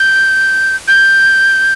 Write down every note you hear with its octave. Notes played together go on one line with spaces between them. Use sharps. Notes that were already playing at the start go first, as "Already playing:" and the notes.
Already playing: G6
G6